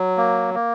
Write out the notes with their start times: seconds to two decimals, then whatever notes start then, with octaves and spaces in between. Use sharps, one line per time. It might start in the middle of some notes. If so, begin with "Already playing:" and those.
Already playing: F#3
0.17 A#3
0.54 A#3